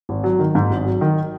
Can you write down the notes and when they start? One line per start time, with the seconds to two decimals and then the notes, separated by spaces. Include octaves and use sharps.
0.09 G#1
0.24 F#3
0.39 D#3
0.55 G#2
0.70 G#1
0.85 F#3
1.01 D#3